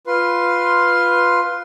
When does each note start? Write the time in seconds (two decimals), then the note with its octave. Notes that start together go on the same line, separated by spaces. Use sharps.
0.07 F4 B4 C6